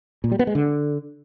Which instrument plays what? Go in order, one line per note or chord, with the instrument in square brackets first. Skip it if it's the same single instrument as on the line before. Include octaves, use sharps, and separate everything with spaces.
[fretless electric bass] A#2
G3
B3
G#3
D3